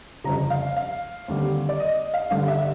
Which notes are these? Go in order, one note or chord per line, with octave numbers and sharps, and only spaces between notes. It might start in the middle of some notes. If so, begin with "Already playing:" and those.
G1 F2 C#3 A#5
F5
F5
D#2 D3 G3 C4
D5
D#5
D#5
F5
G1 G2 D3 F5
E5